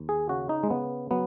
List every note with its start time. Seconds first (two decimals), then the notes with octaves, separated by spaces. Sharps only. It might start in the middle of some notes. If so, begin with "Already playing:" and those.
Already playing: D#2
0.09 G#4
0.29 C#3 F#4
0.49 D#4
0.63 G#3
0.70 C#3 B3
1.11 F#3 B3